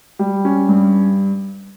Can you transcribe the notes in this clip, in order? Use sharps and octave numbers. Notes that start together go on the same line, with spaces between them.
G3
C#4
G2